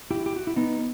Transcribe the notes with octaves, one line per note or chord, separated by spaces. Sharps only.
E4 G4
G4
F#4
E4
B3 D#4